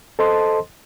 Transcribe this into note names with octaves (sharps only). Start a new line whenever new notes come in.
A4 C5 D#5 A5 C6